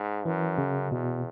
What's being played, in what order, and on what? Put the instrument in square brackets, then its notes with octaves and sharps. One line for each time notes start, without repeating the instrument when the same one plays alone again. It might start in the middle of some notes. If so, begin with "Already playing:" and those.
Already playing: [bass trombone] G#2
[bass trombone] F#2 [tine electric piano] E3
[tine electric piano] C#3
[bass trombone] E2 [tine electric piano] B2